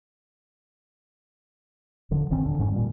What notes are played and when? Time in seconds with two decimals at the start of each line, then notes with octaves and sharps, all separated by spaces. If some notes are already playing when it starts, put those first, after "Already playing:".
2.11 D#1 D3 F3
2.30 G#1 D#3 C4 C#4
2.44 D#1 D3 D4
2.58 F#1 F2 G#2 C#4
2.72 A#2 G3